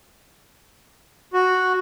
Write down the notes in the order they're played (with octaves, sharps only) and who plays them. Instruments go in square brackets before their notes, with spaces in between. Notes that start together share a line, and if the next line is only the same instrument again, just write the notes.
[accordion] F#4